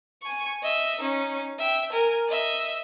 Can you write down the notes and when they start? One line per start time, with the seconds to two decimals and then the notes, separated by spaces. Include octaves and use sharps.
0.23 G#5 C#6
0.62 D#5 E5
1.01 C#4 D#4
1.58 E5 G5
1.93 A#4 G#5
2.28 D#5 E5